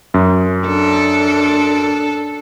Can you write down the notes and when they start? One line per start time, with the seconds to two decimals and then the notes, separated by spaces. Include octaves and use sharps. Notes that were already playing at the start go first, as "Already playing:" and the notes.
0.14 F#2
0.67 D4 A4